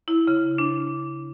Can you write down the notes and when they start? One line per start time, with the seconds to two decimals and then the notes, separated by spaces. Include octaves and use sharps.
0.08 E4
0.27 C#3
0.58 D4